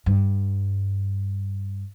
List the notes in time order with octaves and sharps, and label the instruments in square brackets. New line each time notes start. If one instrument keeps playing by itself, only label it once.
[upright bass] G2